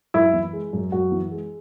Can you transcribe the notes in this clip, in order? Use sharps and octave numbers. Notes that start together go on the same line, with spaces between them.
F#2 E4
E3
G#3
F#2
F#2 F#4
E3
G#3